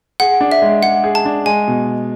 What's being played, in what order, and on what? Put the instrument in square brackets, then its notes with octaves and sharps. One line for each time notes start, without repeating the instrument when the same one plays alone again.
[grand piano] G#4 [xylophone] F#5
[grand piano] D4
[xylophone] E5
[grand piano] G#3
[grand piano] G#3 [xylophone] F#5
[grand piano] G#4
[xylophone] A5
[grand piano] D4
[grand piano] G#3 [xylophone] G#5
[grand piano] B2